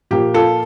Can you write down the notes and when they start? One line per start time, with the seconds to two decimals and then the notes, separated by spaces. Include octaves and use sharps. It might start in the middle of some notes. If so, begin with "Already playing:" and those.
0.11 A#2 F3 A#3 G4
0.34 F4 A4